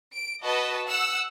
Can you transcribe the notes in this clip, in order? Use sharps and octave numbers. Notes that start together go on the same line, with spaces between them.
D7
F#4 B4 D#5 A5
F#5 E6